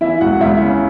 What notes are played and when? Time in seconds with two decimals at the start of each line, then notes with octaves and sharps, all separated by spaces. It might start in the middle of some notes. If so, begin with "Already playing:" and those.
0.01 E3 E4 E5
0.21 C#2 F#4 F#5
0.41 C#2 E4 E5
0.61 C#3